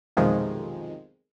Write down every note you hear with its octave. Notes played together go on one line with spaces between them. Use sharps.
B1 F2 C3 D#3 F3 G#3